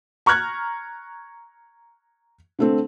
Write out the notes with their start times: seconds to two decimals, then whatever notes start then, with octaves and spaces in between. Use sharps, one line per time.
0.26 A#5 C#6 F6 F#6 G#6
2.59 D3 A3 C4